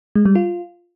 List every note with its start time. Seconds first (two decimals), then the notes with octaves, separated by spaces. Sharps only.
0.15 G#3
0.25 G3
0.35 F4